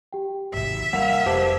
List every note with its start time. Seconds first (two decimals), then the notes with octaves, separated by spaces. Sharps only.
0.13 G4 G5
0.53 G#1 C3 E5
0.93 G3 A#3 A#4 F5 F#5
1.26 F1 G4 G#4 B4 C5 A5 D6